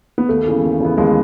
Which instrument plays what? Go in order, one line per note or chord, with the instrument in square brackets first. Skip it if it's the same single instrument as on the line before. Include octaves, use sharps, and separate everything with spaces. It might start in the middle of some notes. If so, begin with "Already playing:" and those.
[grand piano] B3
[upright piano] D#2 [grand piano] A3
[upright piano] C#3 E3 B3
D#2
C#3 E3 B3
[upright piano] D#2 [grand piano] G#3